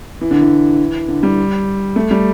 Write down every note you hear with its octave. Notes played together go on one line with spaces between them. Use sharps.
E3
D3
E3
D3
G3
A3
G3